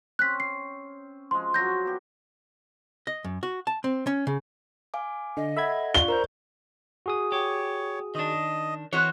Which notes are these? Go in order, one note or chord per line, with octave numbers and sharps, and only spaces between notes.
C4 C#4 F#6 B6
C7
F3 G#3 C6
F#3 F#4 C6 G6 A#6
B3 G4
D#5
F#2
F#4
A5
C4
C#4
C#3
F5 G#5 D6
D3 D#5
A4 E5 F#5 B5 G#6
F4 D5 C#6 G7
A#4 C5 A#5 G6
F#4 G#4 D#6
G4 C#5
D#3 D4 D#5
E3 C4 F#4 C#5